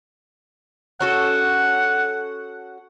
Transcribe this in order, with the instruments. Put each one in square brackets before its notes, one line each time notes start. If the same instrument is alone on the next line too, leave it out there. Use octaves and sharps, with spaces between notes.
[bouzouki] C#4 F#4 A4 [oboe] F#5